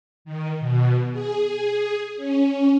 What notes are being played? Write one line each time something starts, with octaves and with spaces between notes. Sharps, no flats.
D#3
B2
G#4
C#4